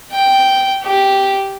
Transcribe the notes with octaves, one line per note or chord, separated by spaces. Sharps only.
G5
G4